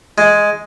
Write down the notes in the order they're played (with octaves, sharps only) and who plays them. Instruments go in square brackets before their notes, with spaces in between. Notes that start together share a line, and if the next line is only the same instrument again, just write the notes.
[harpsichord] G#3